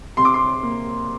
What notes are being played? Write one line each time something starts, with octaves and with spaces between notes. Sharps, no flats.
C3 C6
D6
C6
A#3